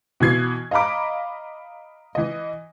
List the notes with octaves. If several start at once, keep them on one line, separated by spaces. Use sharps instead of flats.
B2 E3 G#6 C7
D#5 F5 A#5 B5 D6
E3 D#5